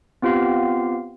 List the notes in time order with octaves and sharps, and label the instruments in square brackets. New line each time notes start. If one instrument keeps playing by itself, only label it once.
[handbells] B3 C4 F4 G4 F5